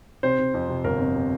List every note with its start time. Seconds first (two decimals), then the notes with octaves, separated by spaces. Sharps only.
0.23 C3 C5
0.39 C3
0.54 F2
0.69 C3
0.84 G1 A#4
1.00 F2
1.15 C3